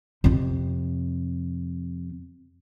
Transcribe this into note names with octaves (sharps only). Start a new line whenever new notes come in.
F2 C3